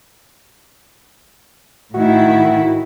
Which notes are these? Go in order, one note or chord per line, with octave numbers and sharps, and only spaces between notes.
A2 D#3 E4 F#4